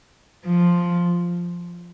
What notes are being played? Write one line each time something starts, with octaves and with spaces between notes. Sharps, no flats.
F3